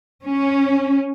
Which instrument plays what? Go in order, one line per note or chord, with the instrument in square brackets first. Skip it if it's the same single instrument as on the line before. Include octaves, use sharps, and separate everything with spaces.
[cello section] C#4